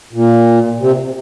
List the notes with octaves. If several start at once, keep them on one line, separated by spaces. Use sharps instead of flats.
A#2
C3